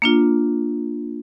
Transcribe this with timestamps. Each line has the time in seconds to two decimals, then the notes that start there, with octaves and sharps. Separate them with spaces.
0.02 A#3 D4 F4